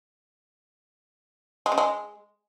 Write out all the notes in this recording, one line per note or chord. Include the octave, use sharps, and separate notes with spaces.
G#3
C#3
G#3